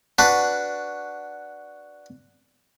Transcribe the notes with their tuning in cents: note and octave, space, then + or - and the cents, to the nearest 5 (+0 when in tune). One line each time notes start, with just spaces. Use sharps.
D4 +0 F#4 +0 B4 +0